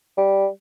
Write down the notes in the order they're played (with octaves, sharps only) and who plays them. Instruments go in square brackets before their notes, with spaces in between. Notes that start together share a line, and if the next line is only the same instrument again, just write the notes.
[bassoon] G3